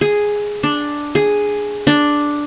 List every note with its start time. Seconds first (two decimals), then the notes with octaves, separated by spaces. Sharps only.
0.01 G#4
0.63 D4
1.15 G#4
1.87 D4